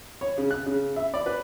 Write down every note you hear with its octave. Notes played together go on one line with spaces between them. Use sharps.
C#5
C#3
F#6
C#3
E5
D5
B4